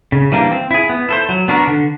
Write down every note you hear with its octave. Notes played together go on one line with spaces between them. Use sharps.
C#3
E3 G3 A#3 D4
C4
E4 G#4
B3
E4 A4 C5
F#3
B3 D4 F#4 A#4
D3